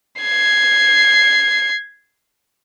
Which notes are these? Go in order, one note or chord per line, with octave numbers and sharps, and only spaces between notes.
G#6 C7